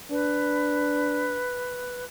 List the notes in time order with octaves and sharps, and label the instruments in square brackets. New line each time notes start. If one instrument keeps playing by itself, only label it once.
[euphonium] D4 [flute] B4